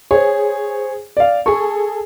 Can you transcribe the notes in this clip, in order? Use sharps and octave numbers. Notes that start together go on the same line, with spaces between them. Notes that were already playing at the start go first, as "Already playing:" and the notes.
G#4 C5 C#5
D5 F5
G#4 A4 C#6